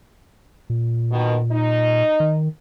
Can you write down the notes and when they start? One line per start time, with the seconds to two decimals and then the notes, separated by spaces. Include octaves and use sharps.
0.70 A#2
1.11 B2 D#3
1.52 D#4
2.20 D#3